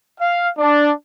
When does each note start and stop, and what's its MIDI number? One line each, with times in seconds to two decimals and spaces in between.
0.19 0.47 77
0.58 0.89 62